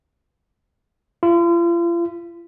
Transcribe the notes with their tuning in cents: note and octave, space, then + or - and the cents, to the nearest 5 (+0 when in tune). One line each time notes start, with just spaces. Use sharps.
F4 -40